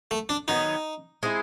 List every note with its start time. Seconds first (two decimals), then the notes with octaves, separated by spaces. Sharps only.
0.11 A3
0.29 D4
0.48 D#3 F#3 B3 D#4
1.23 G#3 C4 E4